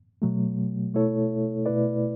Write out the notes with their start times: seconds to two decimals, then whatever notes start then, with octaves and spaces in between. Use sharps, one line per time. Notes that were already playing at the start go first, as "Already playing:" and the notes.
0.22 B2 F#3 A3
0.93 B2 A3 E4 A4 C#5
1.66 B2 A3 E4 B4 D5